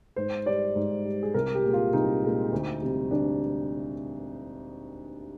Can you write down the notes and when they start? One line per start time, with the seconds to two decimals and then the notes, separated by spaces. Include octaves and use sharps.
0.16 G#2 C5
0.46 G3 D5
0.76 G#2
1.05 G3
1.23 G#4
1.34 C2 A#4
1.55 G4
1.64 A#2 G#3
1.74 F4
1.93 C2 D#4
2.23 A#2 G#3
2.52 D2
2.82 C3 G3
3.11 D2 D4